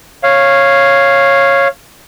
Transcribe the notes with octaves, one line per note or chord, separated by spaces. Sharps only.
C#5 F5